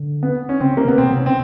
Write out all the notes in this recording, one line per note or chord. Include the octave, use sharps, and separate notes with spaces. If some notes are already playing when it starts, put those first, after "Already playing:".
Already playing: D3
B3
C#4
C#3 C4
A#3
B2 B3
C4
B2
C3
C#4
C4